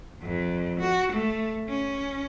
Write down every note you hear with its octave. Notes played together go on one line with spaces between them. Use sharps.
F2
F#4
A3
C#4